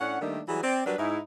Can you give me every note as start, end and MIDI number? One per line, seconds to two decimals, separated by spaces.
0.01 0.19 45
0.01 0.19 61
0.01 0.19 62
0.01 0.19 78
0.21 0.40 51
0.21 0.40 55
0.21 0.40 57
0.21 0.40 58
0.21 0.40 62
0.21 0.40 63
0.48 0.64 52
0.48 0.64 54
0.48 0.64 55
0.48 0.64 68
0.64 0.83 60
0.64 0.83 74
0.86 0.97 54
0.86 0.97 55
0.86 0.97 62
0.86 0.97 70
0.86 0.97 71
0.98 1.19 44
0.98 1.19 63
0.98 1.19 64